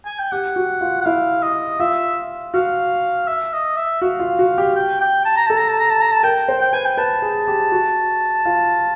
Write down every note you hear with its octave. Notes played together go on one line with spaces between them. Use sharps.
G#5
G5
G4 F#5
F#4
F4
F#5
E4 F5
D#5
F4 E5
F#4 F5
E5
D#5
E5
F#4 F5
F4
F#4
G4
G5
G5
A5
A#5
A4 A5
A#5
A5
A#5
A5
A#5
A5
A#4 G5
C5
G5
B4 G#5
G5
B4 A5
G#4
G4
F#4
F4